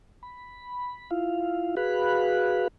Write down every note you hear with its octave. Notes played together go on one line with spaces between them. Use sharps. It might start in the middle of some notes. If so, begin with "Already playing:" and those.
B5
E4 F4 F5
F#4 G#4 B4 F5 B5 F#6